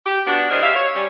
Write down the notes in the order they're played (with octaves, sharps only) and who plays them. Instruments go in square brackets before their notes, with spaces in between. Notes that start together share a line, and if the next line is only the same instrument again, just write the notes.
[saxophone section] G4
B3 D4 F#4
E3 G3 G#4 A#4 C5 D#5
C3 E5 F5
C#5
G3 C#4